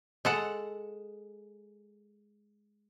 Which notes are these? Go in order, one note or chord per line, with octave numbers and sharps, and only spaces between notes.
G#3 A4 F#5